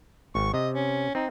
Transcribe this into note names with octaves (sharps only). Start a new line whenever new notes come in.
G#1 C#6
C3 D#5
C#4
C4 D#4